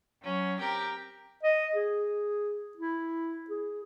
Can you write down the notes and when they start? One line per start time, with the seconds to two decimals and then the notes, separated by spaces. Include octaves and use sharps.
0.22 F#3 C#4
0.59 C4 G4 A#4
1.43 D#5
1.75 G#4
2.77 E4
3.50 G#4